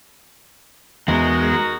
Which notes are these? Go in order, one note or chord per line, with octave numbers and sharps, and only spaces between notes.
E2 G#3 D#4 F#4 A#4